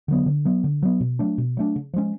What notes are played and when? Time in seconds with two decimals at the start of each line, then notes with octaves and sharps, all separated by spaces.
0.08 D3 F#3 B3
0.26 D3
0.45 F#3 B3
0.64 D3
0.83 F#3 B3
1.00 B2
1.19 F#3 A3 D4
1.38 B2
1.57 F#3 A3 D4
1.76 C#3
1.94 F3 G#3 C#4